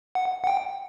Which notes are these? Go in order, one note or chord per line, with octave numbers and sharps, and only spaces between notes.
F#5
F#5
G5